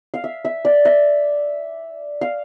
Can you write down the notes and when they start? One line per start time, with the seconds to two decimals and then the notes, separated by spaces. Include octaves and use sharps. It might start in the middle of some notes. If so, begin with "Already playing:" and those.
0.14 F5
0.24 E5
0.45 E5
0.65 D5
0.85 E5
2.21 F5